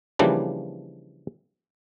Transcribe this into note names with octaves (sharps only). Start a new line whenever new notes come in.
C#3 E3 F3 G3 A#3 D4